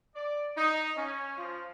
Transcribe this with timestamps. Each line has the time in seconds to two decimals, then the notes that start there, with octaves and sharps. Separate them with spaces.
0.16 D5
0.57 D#4
0.97 C#4
1.37 F3